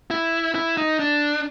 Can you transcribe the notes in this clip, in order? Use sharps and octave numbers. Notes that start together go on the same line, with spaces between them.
E4
E4
D#4
D4